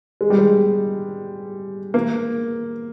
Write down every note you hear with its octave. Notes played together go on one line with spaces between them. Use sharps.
G#3
G3
G#3
A#3